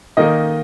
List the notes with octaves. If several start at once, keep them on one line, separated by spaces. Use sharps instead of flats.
D#3 A#3 D#4 D#5